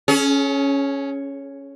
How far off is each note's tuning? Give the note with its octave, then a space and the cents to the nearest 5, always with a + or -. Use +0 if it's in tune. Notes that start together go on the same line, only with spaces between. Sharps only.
C#4 +0 G#4 +45